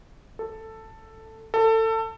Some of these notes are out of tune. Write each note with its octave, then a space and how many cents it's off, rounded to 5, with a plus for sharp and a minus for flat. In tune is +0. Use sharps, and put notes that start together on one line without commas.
A4 +10
A4 +25